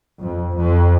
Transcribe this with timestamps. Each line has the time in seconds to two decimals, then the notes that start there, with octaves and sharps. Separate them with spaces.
0.20 F2
0.57 F2